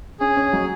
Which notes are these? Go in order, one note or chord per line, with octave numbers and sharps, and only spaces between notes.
C#4 G#4
C#4
F#3